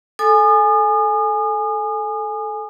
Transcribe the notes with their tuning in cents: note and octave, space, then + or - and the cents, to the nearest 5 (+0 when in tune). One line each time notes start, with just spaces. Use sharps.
A4 -10 G#5 +0 D#6 -35